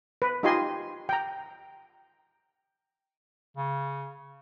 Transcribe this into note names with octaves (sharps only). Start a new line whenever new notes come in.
B4
D#4 F4 G4 D#5 G#5 C6
G5 A#5
C#3